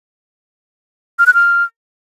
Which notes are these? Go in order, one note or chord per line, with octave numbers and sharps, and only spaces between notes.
F6
F#6
F6